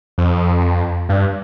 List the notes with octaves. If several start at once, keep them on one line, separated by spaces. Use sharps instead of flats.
F2
G2